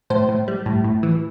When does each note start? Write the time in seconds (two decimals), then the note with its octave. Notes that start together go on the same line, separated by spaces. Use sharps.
0.10 A2 C5
0.29 A2
0.48 G3
0.66 A2
0.84 A2
1.03 E3